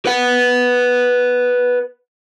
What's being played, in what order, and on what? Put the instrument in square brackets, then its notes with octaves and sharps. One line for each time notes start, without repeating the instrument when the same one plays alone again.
[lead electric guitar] B4 F#5